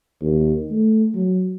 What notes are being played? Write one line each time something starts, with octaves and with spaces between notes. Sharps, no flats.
D#2
A3
F#3